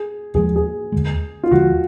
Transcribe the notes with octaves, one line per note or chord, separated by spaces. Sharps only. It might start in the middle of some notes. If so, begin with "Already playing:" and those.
Already playing: G#4
D#2 D3 F3 G#3 G#4
G#4
D#2 D3 F3 G#3
F4
D#2 D3 F3 G#3 F#4